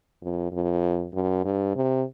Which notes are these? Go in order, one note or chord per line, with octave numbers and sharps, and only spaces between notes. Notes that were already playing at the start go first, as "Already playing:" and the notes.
F2
F2
F#2
G2
C3